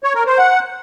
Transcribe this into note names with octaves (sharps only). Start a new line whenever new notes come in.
C#5
A#4
C5
F#5